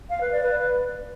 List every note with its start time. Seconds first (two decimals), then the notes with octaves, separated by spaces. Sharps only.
0.10 F5
0.21 B4
0.32 D5
0.43 B4